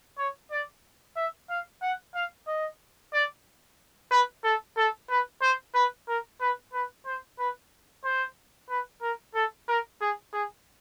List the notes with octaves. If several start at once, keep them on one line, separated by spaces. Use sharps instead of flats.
C#5
D5
E5
F5
F#5
F5
D#5
D5
B4
A4
A4
B4
C5
B4
A#4
B4
B4
C5
B4
C5
B4
A#4
A4
A#4
G#4
G#4